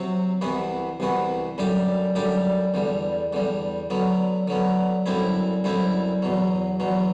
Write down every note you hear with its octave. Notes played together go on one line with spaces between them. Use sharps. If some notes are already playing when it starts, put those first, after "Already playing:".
Already playing: C3 F#3 C4 F#4
C2 C3 E3 B3 F#4
C2 C3 E3 B3 F#4
F#2 D3 G3 D4 G4
F#2 D3 G3 D4 G4
E2 D3 G3
E2 D3 G3
D3 F#3 B3
D3 F#3 B3
F#2 D3 G3 C4 E4
F#2 D3 G3 C4 E4
E2 B2 F#3
E2 B2 F#3